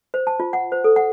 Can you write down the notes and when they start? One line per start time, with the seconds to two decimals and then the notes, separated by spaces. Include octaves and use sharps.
0.14 C5
0.27 A5
0.40 F4
0.53 F#5
0.72 C5
0.84 A4
0.96 F#5